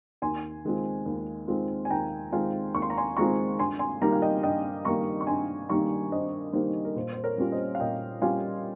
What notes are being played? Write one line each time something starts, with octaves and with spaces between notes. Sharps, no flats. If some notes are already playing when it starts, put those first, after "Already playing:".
D#2 G#5 C6
D#3 G#3 C4 F4
D#2
D#3 G#3 C4 F4
G#5
D#2 G5 A#5
D#3 G#3 C4 F4 F5 G#5
D#2 C#6
C6
A#5
G#5 C6
D#3 G#3 C4 F4 A#5 C#6
G2 G#5 C6
G#5 C6
D#3 G3 A#3 D#4 G5 A#5
F5
D#5 G5
G2 D#5 G5
D#3 G3 A#3 D#4 A#5 C#6
C#6
G2 G#5 C6
D#3 G3 A#3 D#4 A#5 C#6
G2 C5 D#5
D#3 G3 A#3 D#4 C5
A#4
A#2 C5
C5
A#4 C#5
G3 C#4 F4
C5 D#5
F5
A#2 D#5 G5
G3 C#4 F4 F5 G#5